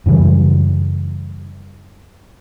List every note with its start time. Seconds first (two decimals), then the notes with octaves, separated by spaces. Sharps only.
0.06 F#2 C#3 E3 G3